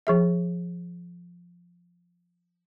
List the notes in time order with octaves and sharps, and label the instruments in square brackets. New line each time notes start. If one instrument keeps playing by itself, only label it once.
[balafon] F3 G#4 E5